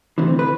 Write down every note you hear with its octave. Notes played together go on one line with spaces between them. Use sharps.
D2 C3 E3
B4